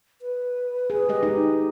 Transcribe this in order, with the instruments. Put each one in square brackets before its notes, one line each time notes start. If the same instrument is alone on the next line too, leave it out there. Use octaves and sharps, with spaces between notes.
[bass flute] B4
[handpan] G#4
G#3 G4 D#5
D#4